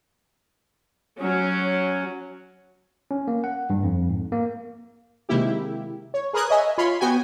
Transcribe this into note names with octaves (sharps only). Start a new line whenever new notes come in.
F#3 C#4
C#4
A#3
F#5
G2
F2
G#2
A#3
C3 D#3 G#3 A#3 E4 G4
C#5
G#4 A#4 B4 D#6 F#6 G#6
C#5 D#5 E5 G#5
F4 C#5 B5 C6
B3 F#4 G5 G#5